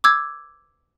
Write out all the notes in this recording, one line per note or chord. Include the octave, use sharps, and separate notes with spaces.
D6 E6 G#6